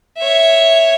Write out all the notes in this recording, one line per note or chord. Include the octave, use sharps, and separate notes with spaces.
C#5 E5